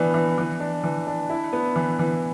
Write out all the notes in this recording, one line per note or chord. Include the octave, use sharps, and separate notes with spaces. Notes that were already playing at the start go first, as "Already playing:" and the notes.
Already playing: E3 B3 D4
E3
E3
D4
E3
D4
E4
B3
E3
E3